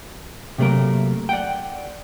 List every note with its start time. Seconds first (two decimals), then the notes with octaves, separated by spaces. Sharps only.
0.58 C3 F#3 A3 A#3 A#4
1.29 D5 F#5 G5